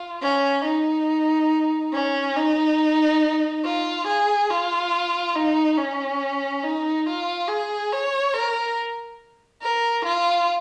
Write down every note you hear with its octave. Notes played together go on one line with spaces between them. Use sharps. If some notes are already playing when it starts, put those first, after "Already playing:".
Already playing: F4
C#4
D#4
C#4
D#4
F4
G#4
F4
D#4
C#4
D#4
F4
G#4
C#5
A#4
A#4
F4